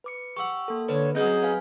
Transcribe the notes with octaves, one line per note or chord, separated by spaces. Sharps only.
B4 D6 C#7
G4 F#5 C#6 E6
A#3 A4
D3 B4 C#5
F#3 C4 C#4 D#4 G#4 G6
B4 F5 G#5